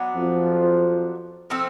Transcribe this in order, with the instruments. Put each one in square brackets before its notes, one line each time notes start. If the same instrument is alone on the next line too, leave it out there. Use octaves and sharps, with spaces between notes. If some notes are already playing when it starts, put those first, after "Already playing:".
Already playing: [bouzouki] F#3 B3 D4
[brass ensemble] F2 F3
[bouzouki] F3 A3 C4